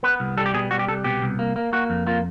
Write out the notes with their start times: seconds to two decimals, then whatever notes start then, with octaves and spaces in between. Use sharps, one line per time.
0.03 B3 B4
0.20 C2
0.37 G3 A4
0.46 G4
0.54 B2 G#4
0.71 G3 F#4
0.79 G4
0.88 C2 A4
1.04 B2 G4
1.22 C2
1.39 A#3
1.56 A#3
1.73 A#3 F#4
1.90 F2
2.07 A#3 F4